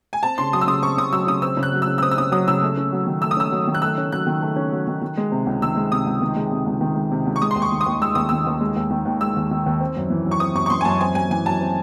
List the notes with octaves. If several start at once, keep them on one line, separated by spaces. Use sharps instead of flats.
G#5
C4 A5
C#3 C6
F#3 D#6
E6
C#3 D#6
C4 C#6
C#3 D#6
F#3 E6
C#3 D#6
C4 E6
C#3
F#6
F#3
E6
C#3
E6
C4 D#6
E6
C#3 D#6
F#3 D#6
C#3 E6
A3
C#4
F#3
D#3
A3 E6
D#6
C#4 E6
F#3
D#3
F#6
A3 E6
C#4
F#3 F#6
D#3
A3
C#4
F#3
D#3
D#3
G#3
C3
C#2
D#3 E6
G#3
C3 D#6
C#2
D#3
G#3
C3
C#2
D#3
G#3
C3
C#2
C#6
G#3 D#6
C6
D#2
C#6
D#3
D#6
D#2
G#3 E6
D#2 D#6
D#3 E6
D#2
G#3
D#2
D#3
D#2
G#3 E6
D#2
D#3
D#2
C4
F#2
E3
F#2
C#6
C4 D#6
F#2 C#6
C#6
E3 C6
G#5
F#2 A5
C4 G#5
F#2 G#5
E3 G#5
F#2 A5
C4